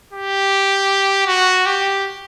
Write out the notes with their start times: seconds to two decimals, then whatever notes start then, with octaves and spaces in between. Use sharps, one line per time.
0.13 G4
1.27 F#4
1.66 G4